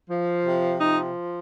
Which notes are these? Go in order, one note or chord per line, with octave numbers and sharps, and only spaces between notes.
F3
C3
F3 D#4